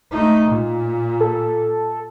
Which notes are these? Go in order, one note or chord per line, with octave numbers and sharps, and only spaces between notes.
A3 D#4
A#2
A4